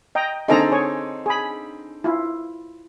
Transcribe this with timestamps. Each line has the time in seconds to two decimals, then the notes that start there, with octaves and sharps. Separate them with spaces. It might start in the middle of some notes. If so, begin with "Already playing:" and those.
0.15 D#5 G5 A#5
0.48 D3 C4 D#4 G#4 A4 A#5
0.70 G#4 C#5
1.26 G#4 B5
2.04 E4 F4